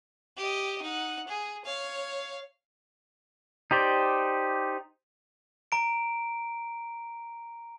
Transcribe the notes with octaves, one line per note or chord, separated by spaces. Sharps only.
G4 D#5
D#4 F#5
G#4
C#5 F5
D#4 G4 C5 D5
A#5 D7